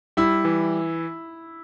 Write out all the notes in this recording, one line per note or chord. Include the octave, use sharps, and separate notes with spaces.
G3 E4
E3